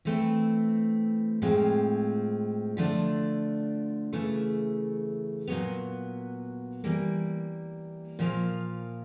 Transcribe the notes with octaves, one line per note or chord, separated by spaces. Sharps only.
E3 A3 C4 E4
A2 F3 G#3 C4 F4
D3 F3 A3 D4
C#3 E3 A3
A#2 F#3 B3
E3 G3 A#3
A#2 F3 A#3